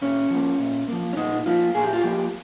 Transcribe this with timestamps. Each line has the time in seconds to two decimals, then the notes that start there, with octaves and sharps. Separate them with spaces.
0.02 A#2 C#4
0.30 F3 A#3
0.59 A#2
0.88 F3 A#3
1.13 C#4
1.17 A#2 D#4
1.46 F3 A#3 F4
1.75 A#2 G#4
1.83 G4
1.93 F4
2.02 F3 A#3 G4